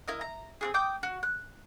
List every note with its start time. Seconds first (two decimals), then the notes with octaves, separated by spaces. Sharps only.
0.08 E4 A#4 D#5
0.21 A#5
0.61 C4 F#4 G#4
0.74 G5 D6 D#6 G6
1.03 F#4
1.23 F#6